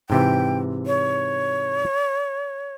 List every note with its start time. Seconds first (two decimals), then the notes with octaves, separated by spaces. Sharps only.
0.10 G#2 C3 E3 G5
0.87 C#5